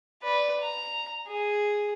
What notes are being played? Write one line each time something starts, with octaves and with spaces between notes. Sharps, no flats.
B4 D5
A#5
G#4